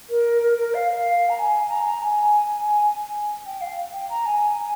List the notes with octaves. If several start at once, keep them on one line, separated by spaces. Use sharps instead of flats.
A#4
A#4
A#4
F5
F5
A#5
G#5
A#5
A#5
G#5
G5
F5
G5
A#5
G#5